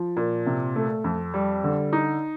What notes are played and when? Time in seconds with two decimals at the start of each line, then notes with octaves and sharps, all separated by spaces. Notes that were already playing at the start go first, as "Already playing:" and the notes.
Already playing: F3
0.17 A#2
0.46 C3
0.76 A3
1.04 F2
1.34 G3
1.64 D3
1.93 D#4